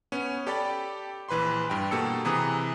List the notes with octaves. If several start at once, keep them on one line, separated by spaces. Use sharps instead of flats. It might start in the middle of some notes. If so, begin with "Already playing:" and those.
B3 C#4
G4 A4 D5 G5 B5 A6
A#1 E3 B4 B5 C6
G2 G5
B2 A#3 G4 A4 E6 C#7
C3 E3 G#4 B4 A#5 D#6